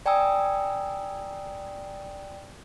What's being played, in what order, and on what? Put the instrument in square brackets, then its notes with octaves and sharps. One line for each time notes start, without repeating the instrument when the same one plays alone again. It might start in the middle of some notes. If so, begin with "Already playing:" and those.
[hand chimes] D5 G5 G#5 A#5 D#6 E6